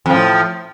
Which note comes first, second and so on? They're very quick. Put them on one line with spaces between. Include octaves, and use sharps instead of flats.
F2 F3 A2